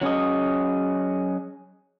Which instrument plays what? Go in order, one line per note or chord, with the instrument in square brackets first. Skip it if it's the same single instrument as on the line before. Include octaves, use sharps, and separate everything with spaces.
[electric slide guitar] F#3 C#4 G#4 D#5